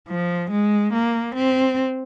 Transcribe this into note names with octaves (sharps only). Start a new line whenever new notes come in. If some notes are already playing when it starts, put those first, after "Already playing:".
F3
G#3
A#3
C4